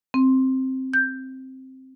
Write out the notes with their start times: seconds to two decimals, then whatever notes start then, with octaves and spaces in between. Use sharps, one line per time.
0.14 C4
0.94 G6